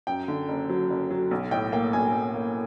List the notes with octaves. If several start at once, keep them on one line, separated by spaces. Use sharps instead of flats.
F#2 G5
D3
F#1
F#3
F#1
F#3
B1
A2 G5
A#3 G5
B1 G#5
B1
A#3